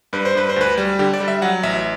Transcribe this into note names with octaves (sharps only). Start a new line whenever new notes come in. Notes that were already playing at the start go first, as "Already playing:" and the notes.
G2 B4
C5
G2 B4
C5
D2 B4
G3
D3 G4
D5
G3
E5
F#3 F#5
A1 E5